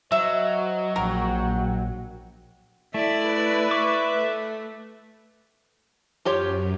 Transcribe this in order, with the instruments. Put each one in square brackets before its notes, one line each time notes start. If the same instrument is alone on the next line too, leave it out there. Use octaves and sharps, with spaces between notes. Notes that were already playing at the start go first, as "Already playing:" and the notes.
[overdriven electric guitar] F#3 [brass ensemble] C5 D#5 [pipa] E5
[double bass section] A#1 [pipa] A#4 [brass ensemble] F#5 G5
[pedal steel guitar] A3 [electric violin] E4 D5 [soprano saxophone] E5
[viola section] B4
[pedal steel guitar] C#6 D6
[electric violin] A3
[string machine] F#2 [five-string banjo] F4 G4 C#5